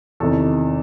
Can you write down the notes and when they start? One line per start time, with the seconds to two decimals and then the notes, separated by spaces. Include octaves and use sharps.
0.20 E2 C3 D#3 A4